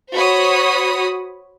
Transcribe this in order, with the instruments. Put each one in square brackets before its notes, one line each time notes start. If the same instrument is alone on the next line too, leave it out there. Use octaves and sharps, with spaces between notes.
[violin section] F#4 C5 C#5 B5 D#6